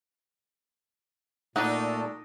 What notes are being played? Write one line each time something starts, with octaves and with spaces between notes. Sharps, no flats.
A#2 A3 D4 D#4 F#5